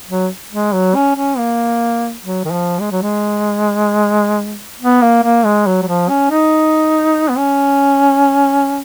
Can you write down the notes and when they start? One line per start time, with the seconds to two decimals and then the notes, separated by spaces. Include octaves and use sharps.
0.09 F#3
0.52 G#3
0.73 F#3
0.95 C#4
1.16 C#4
1.38 A#3
2.24 F#3
2.45 D#3
2.52 F3
2.81 G#3
2.91 F#3
3.02 G#3
4.80 B3
5.02 A#3
5.24 A#3
5.45 G#3
5.66 F#3
5.82 F#3
5.88 F3
6.09 C#4
6.31 D#4
7.30 B3
7.38 C#4